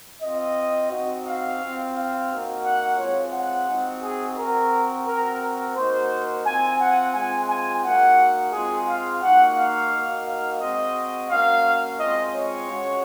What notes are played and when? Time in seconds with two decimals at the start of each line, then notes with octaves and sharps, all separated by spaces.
0.22 C4 F4 D#5
0.92 C4 D#4 F#4
1.26 F5
1.61 C4 F4
1.95 F5
2.30 A#3 D#4 F#4
2.65 F#5
2.99 G#3 C4 F4 C#5
3.33 F#5
3.68 C4 D#4 F#4
4.03 G#4
4.38 C4 F#4 A#4
5.07 C4 F#4 A#4
5.42 A#4
5.76 A#3 D#4 F#4 C5
6.46 C4 F4 G#5
6.81 F#5
7.15 G#3 C4 F4 G#5
7.49 G#5
7.85 A#3 D#4 F#4 F#5
8.53 G#3 C4 F4 G#4
8.89 F5
9.22 A#3 D#4 F#4 F#5
9.58 F5
9.93 A#3 D#4 F#4
10.28 F5
10.61 G#3 C4 F#4 D#5
11.30 A#3 C#4 F#4 F5
12.00 G#3 C4 F4 D#5
12.35 C#5
12.70 G#3 C#4 F#4